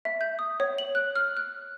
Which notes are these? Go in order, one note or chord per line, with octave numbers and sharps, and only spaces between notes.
E5
G6
D#6
C#5
F#7
F#6
F6
F#6